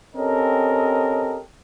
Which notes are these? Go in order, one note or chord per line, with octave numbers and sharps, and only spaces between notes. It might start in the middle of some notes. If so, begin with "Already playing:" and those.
C4 C#4 G4 A4 A#4 D#5